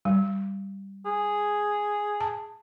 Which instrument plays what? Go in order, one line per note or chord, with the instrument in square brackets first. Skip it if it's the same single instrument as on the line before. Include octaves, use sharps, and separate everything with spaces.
[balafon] G3
[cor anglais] G#4
[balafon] A5